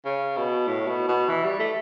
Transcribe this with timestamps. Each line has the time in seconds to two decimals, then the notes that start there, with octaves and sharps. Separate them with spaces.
0.05 C#3
0.36 B2
0.67 A2
0.87 B2
1.08 B2
1.29 E3
1.44 G3
1.59 A3